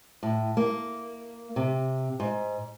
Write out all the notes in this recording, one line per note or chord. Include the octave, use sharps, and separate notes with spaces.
A2
A#3
C3
G#2